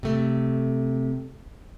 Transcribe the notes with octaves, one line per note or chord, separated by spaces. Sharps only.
C3 A3